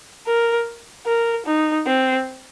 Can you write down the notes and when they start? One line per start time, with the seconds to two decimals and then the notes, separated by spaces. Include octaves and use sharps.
0.27 A#4
1.06 A#4
1.46 D#4
1.86 C4